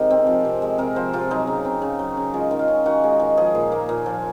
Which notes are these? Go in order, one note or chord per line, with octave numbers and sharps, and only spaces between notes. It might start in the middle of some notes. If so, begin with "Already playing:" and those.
Already playing: C3 D#3 G#3
C4
F3
C3
G#3
C3 A#4
F3 C5
C3 F4
F#3 D#4
C#3
C4
C#3
F#3
C#3
G#3 F4
D#3
F4
C#4
D#3 F#4
G#3
D#3
F3 G#4
A#2
A#3
A#2
F3